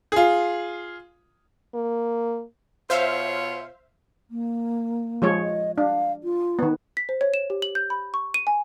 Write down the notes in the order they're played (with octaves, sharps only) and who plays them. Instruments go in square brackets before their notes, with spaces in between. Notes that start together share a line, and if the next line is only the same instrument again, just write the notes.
[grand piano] F4 G#4
[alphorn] A#3
[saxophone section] B2 F4 C#5 [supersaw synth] C5 E5 F5
[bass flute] A#3
[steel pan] F3 G#3 C#5
[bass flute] D#5
[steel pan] D4 [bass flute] F5
[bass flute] F4
[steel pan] D#3 B3
[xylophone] B6
C5
C#5
E7
G4
F#7
G6
B5
C#6
D#7
G#5